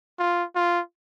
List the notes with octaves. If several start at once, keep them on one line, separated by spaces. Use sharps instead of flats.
F4
F4